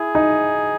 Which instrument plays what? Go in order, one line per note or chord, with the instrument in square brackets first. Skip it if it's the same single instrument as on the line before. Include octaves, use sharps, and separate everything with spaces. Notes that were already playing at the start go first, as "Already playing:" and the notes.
Already playing: [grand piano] E4 [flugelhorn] G#4
[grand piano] D#4